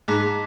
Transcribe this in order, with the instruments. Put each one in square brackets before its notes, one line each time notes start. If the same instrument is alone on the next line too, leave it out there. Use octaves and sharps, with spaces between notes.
[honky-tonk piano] G#2 [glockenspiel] A5 D6 F#6 B6